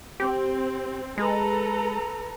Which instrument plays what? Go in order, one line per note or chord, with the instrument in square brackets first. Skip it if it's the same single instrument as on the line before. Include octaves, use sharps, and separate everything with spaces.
[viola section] C4 [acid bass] G4
[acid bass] G#3 [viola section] A4 B4 A#5